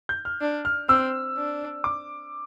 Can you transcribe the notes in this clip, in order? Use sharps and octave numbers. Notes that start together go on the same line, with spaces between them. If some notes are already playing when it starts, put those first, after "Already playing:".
G6
F6
D4
F6
C4 E6
D4
D6